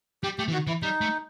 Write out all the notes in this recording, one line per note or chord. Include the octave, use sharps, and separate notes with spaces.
G3 G4
A3 G4
E3
D#3 F#4
E3 E4
G3 D#4
A3